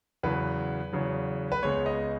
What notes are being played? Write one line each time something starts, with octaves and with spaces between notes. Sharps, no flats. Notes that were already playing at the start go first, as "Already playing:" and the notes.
E2 C#3 F#3 B4
E2 C#3 F#3
B4
C#2 C#3 G#3 B3 C#5
D#5